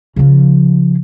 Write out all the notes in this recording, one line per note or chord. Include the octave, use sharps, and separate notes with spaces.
C#3 F3